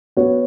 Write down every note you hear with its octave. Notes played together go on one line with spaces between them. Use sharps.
B3 F#4 C#5